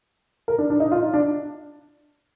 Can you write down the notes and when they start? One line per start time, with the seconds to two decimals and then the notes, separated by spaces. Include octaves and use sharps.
0.48 A#4
0.58 D4
0.70 D4
0.80 D#4
0.91 F4
1.03 D#4
1.14 D4